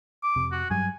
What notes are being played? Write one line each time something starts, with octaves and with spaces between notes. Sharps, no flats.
D6
F1 C3
F#4
G2 F#3 G3 G#5